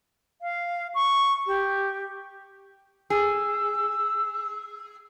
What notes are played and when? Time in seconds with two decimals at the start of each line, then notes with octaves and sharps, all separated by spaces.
0.42 F5
0.95 C#6
1.47 G4
3.10 G#4 E6